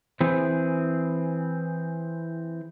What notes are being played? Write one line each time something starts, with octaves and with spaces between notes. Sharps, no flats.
E3 C4 G#4